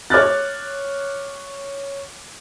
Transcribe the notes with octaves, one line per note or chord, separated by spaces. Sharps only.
C#5 D6 F6 F#6 A6